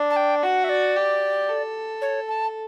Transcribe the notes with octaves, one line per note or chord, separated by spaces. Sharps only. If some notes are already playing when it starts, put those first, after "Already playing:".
Already playing: D4
A5
G5
F#4 F#5
E5
D5
G4
A4
C#5
A5